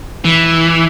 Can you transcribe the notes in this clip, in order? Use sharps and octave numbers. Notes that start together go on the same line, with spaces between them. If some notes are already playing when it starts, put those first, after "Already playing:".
E3